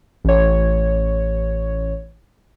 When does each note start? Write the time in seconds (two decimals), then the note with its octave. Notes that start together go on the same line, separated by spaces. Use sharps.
0.25 A1 C#5